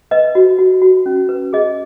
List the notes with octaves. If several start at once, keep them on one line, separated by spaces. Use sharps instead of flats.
B4 D#5
F#4
F#4
F#4
C#4
B4
G#4 D#5